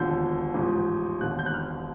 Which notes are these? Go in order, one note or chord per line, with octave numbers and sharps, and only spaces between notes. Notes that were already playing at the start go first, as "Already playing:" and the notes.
Already playing: E1 D#2 D3 F3 G6
A1 G#2 F3
E1 D#2 D3 F#6
G6
F#6
F6